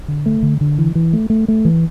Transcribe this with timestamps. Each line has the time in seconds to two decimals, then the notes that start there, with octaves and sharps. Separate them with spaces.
0.08 D3
0.26 A3
0.43 D3
0.61 D3
0.78 E3
0.95 E3
1.13 A3
1.30 A3
1.48 A3
1.65 E3